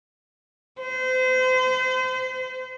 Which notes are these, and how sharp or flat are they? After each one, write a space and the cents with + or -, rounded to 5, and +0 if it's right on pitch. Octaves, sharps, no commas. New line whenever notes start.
C5 -35